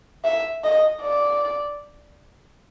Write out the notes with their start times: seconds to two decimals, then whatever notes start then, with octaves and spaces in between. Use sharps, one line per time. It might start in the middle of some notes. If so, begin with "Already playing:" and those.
0.24 E5
0.64 D#5
1.02 D5